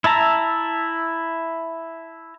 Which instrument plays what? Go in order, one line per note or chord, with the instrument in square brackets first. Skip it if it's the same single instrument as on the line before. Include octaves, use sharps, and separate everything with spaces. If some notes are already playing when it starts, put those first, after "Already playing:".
[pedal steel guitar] E4 E5 A5 A#5